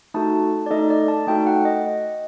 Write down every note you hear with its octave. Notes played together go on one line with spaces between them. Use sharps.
A3 D#4 F#4 A4 A5
D5
A3 D#4 A4 D#5
D5
A5
A3 D#4 F#4 A4 G5
F#5
D#5